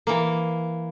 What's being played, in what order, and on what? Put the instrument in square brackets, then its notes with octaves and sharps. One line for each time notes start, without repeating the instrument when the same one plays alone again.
[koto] E3 A#3